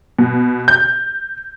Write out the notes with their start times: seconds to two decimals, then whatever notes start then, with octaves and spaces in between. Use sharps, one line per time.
0.19 B2
0.68 G6